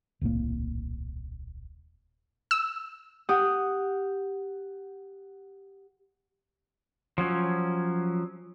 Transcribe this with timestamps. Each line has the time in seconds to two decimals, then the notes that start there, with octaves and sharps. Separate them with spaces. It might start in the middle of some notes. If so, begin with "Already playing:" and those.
0.21 D#1 C2 A2 A#3
2.51 E6
3.29 G4 F#5 D#6
7.18 F3 F#3 C#4